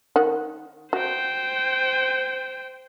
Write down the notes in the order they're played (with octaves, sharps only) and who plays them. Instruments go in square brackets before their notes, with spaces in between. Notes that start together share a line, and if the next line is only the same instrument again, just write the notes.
[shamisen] D#3 F#5
[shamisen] F#4 [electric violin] C5 G5